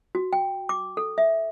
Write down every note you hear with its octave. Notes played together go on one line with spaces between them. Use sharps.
F#4
G5
D6
A4
E5